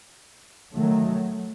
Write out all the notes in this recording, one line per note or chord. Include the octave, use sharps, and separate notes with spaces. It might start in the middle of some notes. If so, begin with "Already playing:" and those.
D#3 F#3 A3